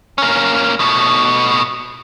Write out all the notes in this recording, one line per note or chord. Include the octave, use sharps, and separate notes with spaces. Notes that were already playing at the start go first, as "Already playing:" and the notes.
A#3 C#4
B2 A3